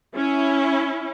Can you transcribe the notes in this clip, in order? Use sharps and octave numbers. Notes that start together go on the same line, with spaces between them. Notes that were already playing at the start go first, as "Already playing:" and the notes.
C#4 E4